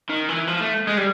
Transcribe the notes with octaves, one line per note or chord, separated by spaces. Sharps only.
D#3
E3
F3
A3
G#3
G3